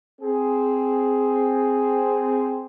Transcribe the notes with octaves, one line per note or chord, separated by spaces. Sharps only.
C4 G#4